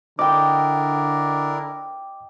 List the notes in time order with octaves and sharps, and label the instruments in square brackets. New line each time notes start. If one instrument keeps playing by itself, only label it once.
[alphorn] D3 [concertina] D4 E4 A#4 [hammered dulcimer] D#5 G5 [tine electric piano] D6